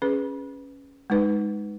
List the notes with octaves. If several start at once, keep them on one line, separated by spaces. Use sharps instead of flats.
C#4 G#4 B4
G#3 D#4 B4